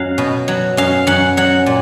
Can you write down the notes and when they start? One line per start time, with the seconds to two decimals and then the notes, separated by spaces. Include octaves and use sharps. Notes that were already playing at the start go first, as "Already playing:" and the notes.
Already playing: F#2 F#3 F5
0.18 B2
0.48 F#3
0.77 F#2 F5
1.07 F#2 F#5
1.37 F#3 F#5
1.66 A#2